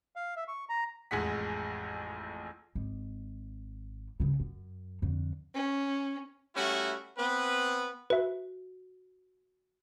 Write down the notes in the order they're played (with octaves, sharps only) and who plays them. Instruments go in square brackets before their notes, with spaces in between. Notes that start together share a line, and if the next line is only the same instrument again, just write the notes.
[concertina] F5
E5
C#6
A#5
[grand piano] A1 F2 G#3 G#4 F#5 B6
[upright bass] G#1
G2 C#3
F#2
F2 D3
[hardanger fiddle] C#4
[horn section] G3 A3 C#4 E4 F#4
B3 C4 B4
[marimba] F#4 [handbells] B4 E5